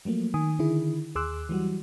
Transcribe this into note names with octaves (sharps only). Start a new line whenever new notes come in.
F3 F#3 A3 A#3
D#3 G#5 D#6
D3 D#3 E4 G#4
D#2 G#4 C6 D6 E6 F#6
E3 F#3 G3 F#4